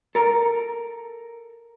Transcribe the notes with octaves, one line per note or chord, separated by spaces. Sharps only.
A4 A#4